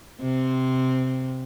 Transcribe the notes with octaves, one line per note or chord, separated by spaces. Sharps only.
C3 C4